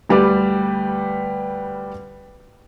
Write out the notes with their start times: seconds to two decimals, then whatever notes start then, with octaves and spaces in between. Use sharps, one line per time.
0.09 D2 G3 G4 B4 D5